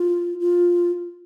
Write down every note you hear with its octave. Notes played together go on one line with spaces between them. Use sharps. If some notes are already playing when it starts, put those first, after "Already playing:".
Already playing: F4
F4